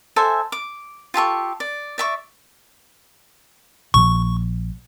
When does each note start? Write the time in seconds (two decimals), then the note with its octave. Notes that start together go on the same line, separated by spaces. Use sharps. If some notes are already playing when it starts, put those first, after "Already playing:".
0.16 A4 C5 E5 G#5
0.52 D6
1.14 F4 G4 A4 C#6
1.60 D5
1.98 D5 E5 C#6
3.94 A#1 A#2 F3 C#6